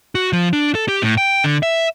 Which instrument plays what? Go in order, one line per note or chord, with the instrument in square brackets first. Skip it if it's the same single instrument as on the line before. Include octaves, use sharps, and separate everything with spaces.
[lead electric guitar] F#4
F3
D4
A4
G4
A2
G5
D3
E5